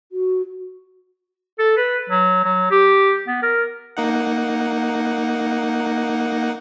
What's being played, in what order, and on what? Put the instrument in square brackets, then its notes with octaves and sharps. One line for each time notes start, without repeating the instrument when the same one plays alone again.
[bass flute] F#4
[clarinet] A4
B4
F#3
F#3
G4
B3
A#4
[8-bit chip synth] A#3 D#4 F#5